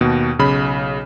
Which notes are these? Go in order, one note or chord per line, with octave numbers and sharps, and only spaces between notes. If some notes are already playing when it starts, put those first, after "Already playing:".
D#2 B2
B1 C#3 B5